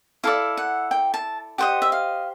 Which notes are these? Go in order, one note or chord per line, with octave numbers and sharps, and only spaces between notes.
E4 A4 D5 F5
F#5
G5
A5
G4 C5 D#5 F#5
E5
F5